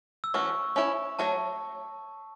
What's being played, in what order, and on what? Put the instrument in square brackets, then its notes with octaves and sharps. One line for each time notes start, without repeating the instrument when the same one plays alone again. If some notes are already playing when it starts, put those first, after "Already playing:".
[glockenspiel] E6
[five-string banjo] E3 A3 C#4 F#4 [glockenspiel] C#6
[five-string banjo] C#4 E4 C#5
[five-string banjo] F#3 A3 C#5 [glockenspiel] A5